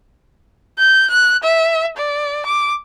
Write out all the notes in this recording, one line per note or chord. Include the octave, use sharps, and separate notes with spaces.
G6
F#6
E5
D5
D6